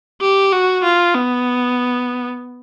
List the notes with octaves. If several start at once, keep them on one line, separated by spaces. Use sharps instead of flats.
G4
F#4
F4
B3